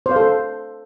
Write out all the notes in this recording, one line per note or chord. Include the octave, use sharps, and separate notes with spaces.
C5
F5
A4